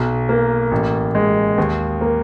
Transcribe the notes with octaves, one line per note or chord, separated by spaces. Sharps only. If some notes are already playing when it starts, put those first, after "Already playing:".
Already playing: B1
A#3
A1
G#3
D#2
A#3